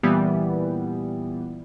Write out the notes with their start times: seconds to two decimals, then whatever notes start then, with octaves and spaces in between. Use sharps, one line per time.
0.03 A#2 E3 G3 B3